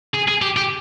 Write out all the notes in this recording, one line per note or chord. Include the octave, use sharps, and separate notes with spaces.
G#4
G#4
G4
G4